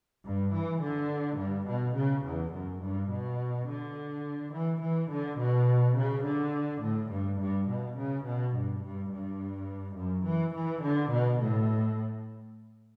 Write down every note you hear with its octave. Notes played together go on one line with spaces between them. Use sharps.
G2
E3
D3
G2
B2
C#3
E2
F#2
G2
B2
D3
E3
E3
D3
B2
C#3
D3
A2
G2
G2
B2
C#3
B2
G2
G2
G2
F#2
E3
E3
D3
B2
A2